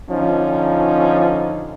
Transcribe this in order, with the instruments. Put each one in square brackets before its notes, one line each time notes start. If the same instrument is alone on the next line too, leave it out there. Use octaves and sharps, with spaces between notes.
[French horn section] D3 C#4 D#4 [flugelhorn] F3